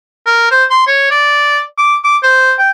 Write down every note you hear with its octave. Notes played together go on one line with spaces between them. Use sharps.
A#4
C5
C6
C#5
D5
D6
D6
C5
G5